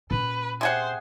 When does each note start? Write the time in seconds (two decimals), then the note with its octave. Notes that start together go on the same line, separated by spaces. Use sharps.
0.11 A#2 C#4 B4
0.61 C3 G#4 C5 F#5